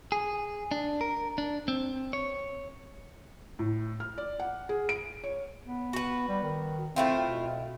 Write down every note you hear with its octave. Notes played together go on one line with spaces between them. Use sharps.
G#4
D4
A#4
D4
C4
C#5
A2
F6
D5
F#5
G#4
D7
C#5
B3
F#4 B4
G3
D#3
A3 C4 E4 F4
B2